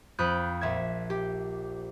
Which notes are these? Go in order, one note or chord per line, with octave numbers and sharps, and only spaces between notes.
F2 B5 D#6 F#6 G6 D7
A#1 E5 G#6
G4